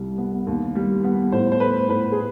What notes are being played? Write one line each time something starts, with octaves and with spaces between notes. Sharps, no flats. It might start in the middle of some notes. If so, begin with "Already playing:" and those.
Already playing: C2 G3
B3
D#2
G3
B3
A2 C5
C5
A3 B4
A2 B4
G#4